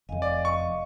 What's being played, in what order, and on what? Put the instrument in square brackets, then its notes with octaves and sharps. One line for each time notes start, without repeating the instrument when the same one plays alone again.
[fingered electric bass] F1 F2 [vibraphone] D#5 F5 G#5
[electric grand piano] D5
[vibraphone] D#5 F5 [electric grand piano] C#6